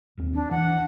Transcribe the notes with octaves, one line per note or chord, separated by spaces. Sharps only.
E1 D#2 C4
D4
E3 F#5